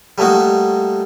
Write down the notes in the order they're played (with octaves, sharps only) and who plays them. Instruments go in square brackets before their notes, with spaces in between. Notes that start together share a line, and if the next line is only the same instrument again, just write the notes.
[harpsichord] G3 A3 A#3 D#4 F#4